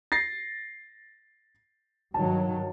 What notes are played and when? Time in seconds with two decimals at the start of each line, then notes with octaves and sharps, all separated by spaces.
0.12 A6 A#6 C7
2.14 G2 D#3 F#3 A5